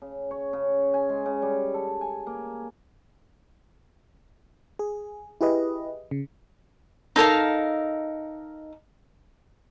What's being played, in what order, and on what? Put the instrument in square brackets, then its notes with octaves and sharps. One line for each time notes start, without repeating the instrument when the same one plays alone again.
[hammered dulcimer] C#3
C#5
C#3
G#5
G#3
C#3
G3
A4
G#5
A#3
[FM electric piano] G#4
E4 G4 G#4 B4 D#5
C#3
[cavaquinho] D#4 A4 A#4 F5